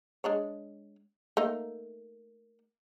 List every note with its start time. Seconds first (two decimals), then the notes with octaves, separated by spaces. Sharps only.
0.24 G#3 D4 C#5
1.37 A3 A#3 D#4